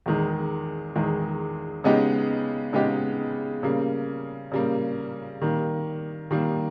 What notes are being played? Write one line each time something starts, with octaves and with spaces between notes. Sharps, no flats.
E2 D#3 G#3
E2 D#3 G#3
C#3 G#3 B3 D#4 G4
C#3 G#3 B3 D#4 G4
C#3 G3 A#3
C#3 G3 A#3
D#3 G3 A#3
D#3 G3 A#3